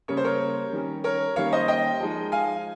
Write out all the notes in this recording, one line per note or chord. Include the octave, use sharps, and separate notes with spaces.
C#3 G3 A#3 C#5
C5
A#4 C#5
D#3 G3 C#4
A#4 C#5
D#3 G3 A#3 C#4 C#5 F5
C5 D#5
D#5 G5
F3 G#3 D#4
F5 G#5